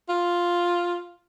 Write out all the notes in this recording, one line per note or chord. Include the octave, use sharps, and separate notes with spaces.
F4